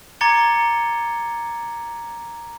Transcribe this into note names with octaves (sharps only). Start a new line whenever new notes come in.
A#5 D6 G#6 A6 C#7 G7